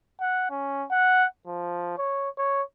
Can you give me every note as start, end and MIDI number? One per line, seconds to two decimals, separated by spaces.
0.21 0.47 78
0.50 0.85 61
0.90 1.26 78
1.47 1.97 53
1.98 2.29 73
2.38 2.62 73